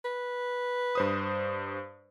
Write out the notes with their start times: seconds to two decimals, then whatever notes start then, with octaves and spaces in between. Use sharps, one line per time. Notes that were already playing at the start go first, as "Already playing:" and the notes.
0.05 B4
0.95 G2 C5 D#6